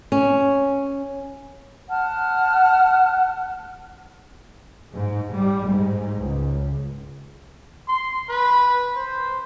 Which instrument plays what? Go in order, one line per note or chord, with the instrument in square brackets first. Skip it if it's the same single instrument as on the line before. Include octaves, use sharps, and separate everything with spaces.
[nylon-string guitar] C#4
[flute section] F#5 A5 F6
[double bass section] G#2
G3
G#2
C#2
[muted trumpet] C6
B4
C5